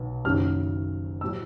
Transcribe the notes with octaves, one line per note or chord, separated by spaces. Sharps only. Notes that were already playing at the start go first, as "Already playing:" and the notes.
Already playing: B1 B2 B3
F#1 F#2 D#3 F#3 F6
A2 F#3 E6